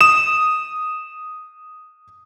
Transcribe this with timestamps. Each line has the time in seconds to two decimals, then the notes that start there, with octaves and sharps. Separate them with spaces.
0.01 D#6 E7